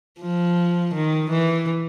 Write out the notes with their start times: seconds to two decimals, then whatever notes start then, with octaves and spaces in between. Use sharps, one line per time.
0.21 F3
0.94 D#3
1.30 E3